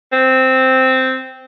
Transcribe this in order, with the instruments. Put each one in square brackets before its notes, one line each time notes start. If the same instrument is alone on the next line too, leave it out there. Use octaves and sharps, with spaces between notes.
[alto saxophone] C4